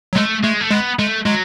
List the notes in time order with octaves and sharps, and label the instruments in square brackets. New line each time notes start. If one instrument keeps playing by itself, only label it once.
[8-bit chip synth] F#3
[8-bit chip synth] G#3 [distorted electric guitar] A3
[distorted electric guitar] G#3 [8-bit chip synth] A3
[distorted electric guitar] A3
[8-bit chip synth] G#3 [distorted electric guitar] B3
[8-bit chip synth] G#3 [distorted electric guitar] A3
[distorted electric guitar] F#3 [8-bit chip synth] G#3